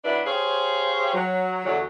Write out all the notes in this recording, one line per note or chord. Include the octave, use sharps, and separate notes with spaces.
F#3 D4 E4 B4
G4 G#4 C5 C#5 F5
F#3
E2 D3 F#3